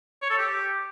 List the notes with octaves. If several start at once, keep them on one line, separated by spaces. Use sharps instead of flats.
C#5
A4
G4